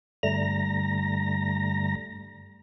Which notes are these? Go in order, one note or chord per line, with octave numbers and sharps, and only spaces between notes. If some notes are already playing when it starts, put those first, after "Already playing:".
G2 D3 G3 A3 A#5 A#6